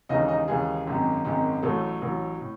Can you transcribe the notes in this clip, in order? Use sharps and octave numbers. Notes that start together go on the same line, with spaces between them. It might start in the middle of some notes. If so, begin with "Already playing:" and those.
D#2 C#3 E3 G#3 D#4 D#5
D#4 D#5
D#2 C#3 E3 G#3 G#4
G#1 F#2 D#3 G#3
G#1 F#2 D#3 G#3
A1 A2 F#3 A3 A4
A1 A2 F#3
A2